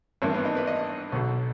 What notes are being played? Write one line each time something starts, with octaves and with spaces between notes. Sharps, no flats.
G#1 G2 E3 A#3
B3
D#4
B4
D#5
B1 B2